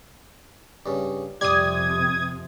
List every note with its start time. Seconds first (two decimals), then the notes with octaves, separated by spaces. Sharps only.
0.86 G2 C#3
1.41 F2 C3 G3 D5 C6 D#6 G#6